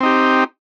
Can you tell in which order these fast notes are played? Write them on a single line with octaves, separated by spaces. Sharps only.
C4 D#4 G4